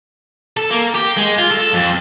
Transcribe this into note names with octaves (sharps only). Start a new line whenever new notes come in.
A4
A#3
G4
G#3
F4
A4
F2